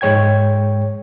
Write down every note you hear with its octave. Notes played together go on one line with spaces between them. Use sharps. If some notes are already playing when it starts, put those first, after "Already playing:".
G#2 G#3 C#5 G5 G#6